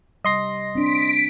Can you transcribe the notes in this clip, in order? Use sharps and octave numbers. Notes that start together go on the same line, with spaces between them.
C3 G3 D#5 C6 A#6
C4 D4 B6 D7